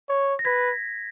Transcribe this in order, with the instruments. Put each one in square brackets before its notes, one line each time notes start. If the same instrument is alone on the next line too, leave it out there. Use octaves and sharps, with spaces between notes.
[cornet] C#5
[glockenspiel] A#6
[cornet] B4 [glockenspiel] G#6 B6